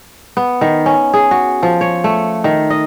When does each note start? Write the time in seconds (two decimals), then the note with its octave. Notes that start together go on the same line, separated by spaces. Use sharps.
0.37 B3
0.61 D#3
0.86 C#4
1.14 G#4
1.31 F#4
1.63 F3
1.81 C#5
2.04 A3
2.44 D#3
2.70 D#5